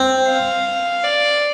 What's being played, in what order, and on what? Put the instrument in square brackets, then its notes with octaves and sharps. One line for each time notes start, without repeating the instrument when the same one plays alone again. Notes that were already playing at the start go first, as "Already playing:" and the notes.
Already playing: [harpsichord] C4
[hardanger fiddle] F5
D5